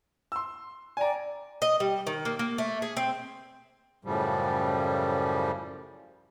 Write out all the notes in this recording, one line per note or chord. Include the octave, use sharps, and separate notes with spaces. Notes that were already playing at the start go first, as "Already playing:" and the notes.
C6 E6
D5 G5 G#5 A#5
D#5
G3
D#3
A#3
A#3
A3
G#4
C4
F#2 A2 C#3 F3 G3